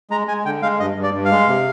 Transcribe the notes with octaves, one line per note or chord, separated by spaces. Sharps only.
G#3 A#5
G#3 G#5
D3 G5
G#3 F5
G2 D#5
G2
D5
G2
F5
G#3
C3